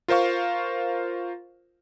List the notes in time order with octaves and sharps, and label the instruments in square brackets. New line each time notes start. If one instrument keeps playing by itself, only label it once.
[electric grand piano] F4 A#4 C5 F5 C#6